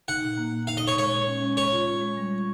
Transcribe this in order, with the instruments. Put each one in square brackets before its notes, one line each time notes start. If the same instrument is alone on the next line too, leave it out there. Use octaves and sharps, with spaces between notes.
[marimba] D#4 [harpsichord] F#5
[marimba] A#2
A#3
A#3
[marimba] D#4 [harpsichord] F5
[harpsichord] D#5
[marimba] A#2 [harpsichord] C#5
[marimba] G#3 [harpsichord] C#5
[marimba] G#3
C#4
G#3
[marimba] G#3 [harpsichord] C#5
[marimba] F4
F4
G#3
G3